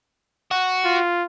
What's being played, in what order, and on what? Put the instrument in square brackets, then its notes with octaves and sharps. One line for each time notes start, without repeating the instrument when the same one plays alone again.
[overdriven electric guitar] F#4
[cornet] F4